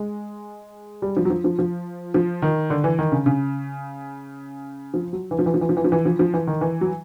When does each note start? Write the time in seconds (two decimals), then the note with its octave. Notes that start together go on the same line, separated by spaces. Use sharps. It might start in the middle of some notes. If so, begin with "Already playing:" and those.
Already playing: G#3
1.02 G3
1.17 F3
1.25 F#3
1.30 F3
1.44 F3
1.59 F3
2.14 F3
2.42 D#3
2.70 D3
2.84 E3
2.99 D#3
3.12 C#3
3.26 C#3
4.94 F3
5.13 F#3
5.31 E3
5.39 F3
5.46 E3
5.54 F3
5.61 E3
5.69 F3
5.77 E3
5.84 F3
5.92 E3
6.05 F3
6.19 F3
6.34 E3
6.47 D#3
6.61 E3
6.81 F#3